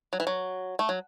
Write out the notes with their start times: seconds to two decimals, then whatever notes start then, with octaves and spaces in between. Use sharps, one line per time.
0.13 F#3
0.20 E3
0.27 F#3
0.79 A3
0.89 F#3